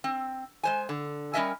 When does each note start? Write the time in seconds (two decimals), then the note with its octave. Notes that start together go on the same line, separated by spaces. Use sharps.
0.04 C4
0.63 G#3 C5 G#5
0.89 D3
1.33 G3 C#4 A#4 D#5 E5 G#5